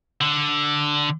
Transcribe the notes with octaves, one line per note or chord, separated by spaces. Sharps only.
D3